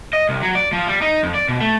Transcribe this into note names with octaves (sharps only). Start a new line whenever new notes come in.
D#5
C2
F#3
D5
F3
G3
D#4
F2
D5
B2
A3